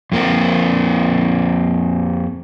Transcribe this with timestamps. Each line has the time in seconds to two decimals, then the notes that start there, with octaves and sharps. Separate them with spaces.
0.12 F2 A#3 C4